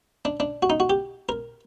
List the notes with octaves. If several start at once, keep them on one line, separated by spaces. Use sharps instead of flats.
D4
D4
F#4
D#4
F#4
G4
A#4